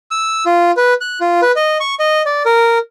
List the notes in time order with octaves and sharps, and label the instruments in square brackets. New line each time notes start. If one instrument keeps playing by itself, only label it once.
[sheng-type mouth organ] E6
F4
B4
F#6
F4
B4
D#5
C#6
D#5
D5
A#4